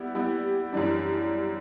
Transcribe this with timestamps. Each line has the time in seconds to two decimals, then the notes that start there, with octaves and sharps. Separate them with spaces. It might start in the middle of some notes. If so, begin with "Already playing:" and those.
Already playing: G3 B3 E4 G4
0.15 G3 B3 E4 G4
0.73 F#2 E3 G3 D4